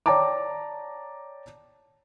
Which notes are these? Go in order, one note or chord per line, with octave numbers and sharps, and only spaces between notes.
C#5 D5 G5 A5 A#5 D6